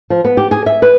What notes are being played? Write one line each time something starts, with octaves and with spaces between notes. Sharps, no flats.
F3
B3
G4
G#4
E5
B4